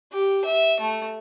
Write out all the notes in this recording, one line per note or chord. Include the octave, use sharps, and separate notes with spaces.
G4
E5
A3